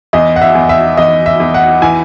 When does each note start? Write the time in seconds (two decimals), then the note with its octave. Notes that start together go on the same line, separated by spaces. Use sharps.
0.13 E2 D#5
0.36 F#5
0.41 E5
0.55 E2
0.69 E5
0.97 E2 D#5
1.26 E5
1.40 E2
1.54 F#5
1.82 E3 G#5